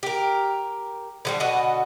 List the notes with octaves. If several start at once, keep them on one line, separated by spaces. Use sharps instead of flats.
G4 A#4
D3 F#3 G3
B2 D3 F#4 D#5